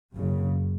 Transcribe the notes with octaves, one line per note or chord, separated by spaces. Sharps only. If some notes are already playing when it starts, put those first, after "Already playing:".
F#1 F#2 C#3